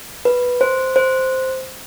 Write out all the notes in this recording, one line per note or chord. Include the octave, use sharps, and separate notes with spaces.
B4
C5
C5